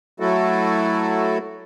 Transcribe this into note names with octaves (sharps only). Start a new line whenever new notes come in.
F#3 A3 E4 F#4 A4